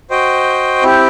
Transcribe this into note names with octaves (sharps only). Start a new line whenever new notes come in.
F#4 C5 D#5 G5
C4 E4 G4